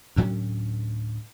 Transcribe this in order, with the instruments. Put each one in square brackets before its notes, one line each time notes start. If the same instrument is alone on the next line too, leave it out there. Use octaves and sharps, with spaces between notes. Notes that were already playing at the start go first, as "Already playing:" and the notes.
[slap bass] D2 A2 F#3 C#4